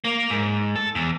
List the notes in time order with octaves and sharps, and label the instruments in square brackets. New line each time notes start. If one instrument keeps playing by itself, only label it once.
[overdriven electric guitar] A#3
G#2
A4
E2